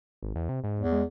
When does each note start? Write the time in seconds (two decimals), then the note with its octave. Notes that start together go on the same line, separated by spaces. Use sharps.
0.22 G#1
0.35 E2
0.49 C3
0.64 G#2
0.80 E2
0.92 G#3